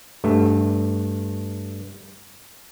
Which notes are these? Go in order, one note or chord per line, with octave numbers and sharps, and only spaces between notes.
G2 A3